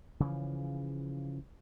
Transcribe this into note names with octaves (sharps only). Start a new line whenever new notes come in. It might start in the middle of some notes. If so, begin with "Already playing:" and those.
C#3 E3 F3